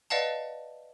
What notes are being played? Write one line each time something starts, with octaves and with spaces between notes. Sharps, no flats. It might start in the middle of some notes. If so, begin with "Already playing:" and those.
B4 D5 D#5 F5 F#5 A5